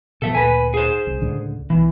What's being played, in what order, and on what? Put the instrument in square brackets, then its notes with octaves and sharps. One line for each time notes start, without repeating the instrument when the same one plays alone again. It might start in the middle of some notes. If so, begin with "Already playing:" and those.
[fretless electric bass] B2 D#3 F3 [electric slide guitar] A4 E5
[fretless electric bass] D2 A#2 [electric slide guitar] B4 G#5
[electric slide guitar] G#4 C5
[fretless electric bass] C2
C#2 A2 D3
[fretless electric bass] B1 [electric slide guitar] E3